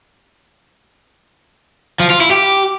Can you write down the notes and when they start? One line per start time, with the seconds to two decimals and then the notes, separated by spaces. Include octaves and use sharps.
2.00 F3
2.10 F4
2.21 E4
2.31 G4